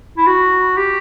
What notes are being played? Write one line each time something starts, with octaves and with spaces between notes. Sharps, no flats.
E4
F#4
G4